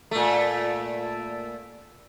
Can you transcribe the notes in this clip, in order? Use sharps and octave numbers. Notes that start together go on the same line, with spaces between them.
A#2 A3